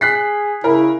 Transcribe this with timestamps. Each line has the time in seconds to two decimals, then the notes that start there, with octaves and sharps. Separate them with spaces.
0.01 G#4 F#6 B6 C7
0.64 C#3 E4 A#4